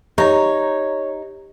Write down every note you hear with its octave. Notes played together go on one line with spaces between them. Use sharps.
D#4 G4 C#5 A#5